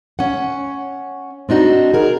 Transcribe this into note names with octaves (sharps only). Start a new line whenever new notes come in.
C#4 F#5
C4 D4 D#4 F#4
G#4 A#4